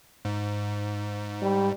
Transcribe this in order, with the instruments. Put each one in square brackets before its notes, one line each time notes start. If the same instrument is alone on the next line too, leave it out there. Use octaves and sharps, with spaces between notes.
[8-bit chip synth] G#2
[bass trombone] G3